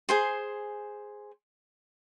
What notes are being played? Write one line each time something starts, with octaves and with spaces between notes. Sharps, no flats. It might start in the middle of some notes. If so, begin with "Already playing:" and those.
G#4 C5 C6